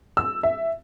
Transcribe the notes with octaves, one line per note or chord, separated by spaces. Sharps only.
E6
E5